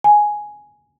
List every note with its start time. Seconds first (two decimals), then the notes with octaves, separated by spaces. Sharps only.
0.04 G#5